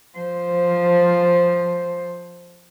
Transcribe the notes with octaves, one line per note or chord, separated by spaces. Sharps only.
F3 C5